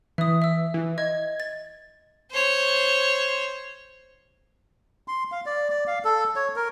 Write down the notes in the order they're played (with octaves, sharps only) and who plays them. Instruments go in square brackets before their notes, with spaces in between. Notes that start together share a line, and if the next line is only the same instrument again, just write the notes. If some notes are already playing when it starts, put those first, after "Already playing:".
[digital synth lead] E3 [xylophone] E5 D#6
[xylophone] E5 E6
[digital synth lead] E3
[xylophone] D#5 [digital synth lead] G#6
[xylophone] A6
[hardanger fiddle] C5 C#5
[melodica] C6
F5
D5
D5
F5
A4
C#5
A#4